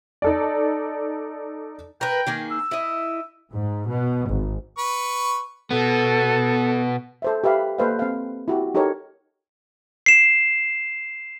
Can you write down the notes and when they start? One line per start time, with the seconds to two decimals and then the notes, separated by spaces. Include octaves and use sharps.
0.22 D#4 A4 D5
2.01 A#4 B4 G5
2.27 D#3 A#3 G#4
2.51 E6
2.71 E4 D#5
3.53 G#2
3.88 B2
4.30 G#1
4.78 B4 C#6
5.71 B2 B3 A4
7.22 A4 C5 E5
7.44 G4 B4 E5 F5 B5
7.78 A#3 A4 B4 C5 D#5 F5
7.99 C4 F5
8.48 E4 F#4 G4
8.75 D#4 G4 A4 A#4 C#5
10.06 C7 E7